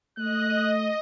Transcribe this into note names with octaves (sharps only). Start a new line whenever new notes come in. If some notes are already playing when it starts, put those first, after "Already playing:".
A3 D#5 F#6